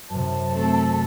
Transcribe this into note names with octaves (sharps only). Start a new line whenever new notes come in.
F#2 C3 A5
A3 C4 A4